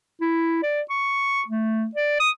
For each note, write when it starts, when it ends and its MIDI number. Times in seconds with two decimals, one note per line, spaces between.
0.21 0.59 64
0.63 0.81 74
0.90 1.43 85
1.48 1.87 57
1.95 2.16 74
2.20 2.30 87